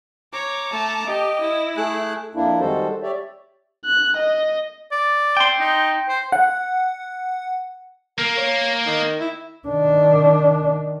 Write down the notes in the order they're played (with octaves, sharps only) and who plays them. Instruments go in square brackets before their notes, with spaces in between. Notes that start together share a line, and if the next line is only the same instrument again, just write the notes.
[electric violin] C#5 [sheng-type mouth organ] A#5 D6
[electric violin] A3 A5
[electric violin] G4 [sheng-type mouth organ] D#5
[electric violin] E4
[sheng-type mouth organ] A3 G#4 F#6
[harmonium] F2 A#3 D4 E4
D#3 G3 G#3 F#4 A4 C5
G4 C#5 D5 E5
[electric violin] F#6
D#5
[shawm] D5
[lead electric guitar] G5 C6
[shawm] D#4
C5
[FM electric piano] F#5
[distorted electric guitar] A#3 [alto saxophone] A#4
[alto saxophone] C#5
D#3
E4
[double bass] D#3 D4